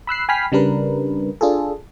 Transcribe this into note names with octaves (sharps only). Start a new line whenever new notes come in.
B5 E6 F#6 C7
G5 G#5 B5 F6 B6 C7
C#3 G3 D4 A#4 B4
D4 F4 G#4 A4